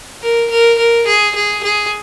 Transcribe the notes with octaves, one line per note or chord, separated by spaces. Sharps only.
A#4
A#4
A#4
G#4
G#4
G#4